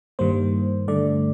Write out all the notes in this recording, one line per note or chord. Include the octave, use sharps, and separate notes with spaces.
G2 D#3 G3 A#3 C5
G2 D3 A3 D5